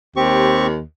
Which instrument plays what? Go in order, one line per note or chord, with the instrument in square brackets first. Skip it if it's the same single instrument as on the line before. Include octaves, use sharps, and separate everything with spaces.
[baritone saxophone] D#2 [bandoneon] C4 G4 C#6